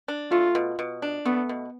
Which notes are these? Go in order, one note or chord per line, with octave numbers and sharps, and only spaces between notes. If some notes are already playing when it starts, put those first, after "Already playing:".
D4
A3 F4
B2
B2
D4
A3 B3
B2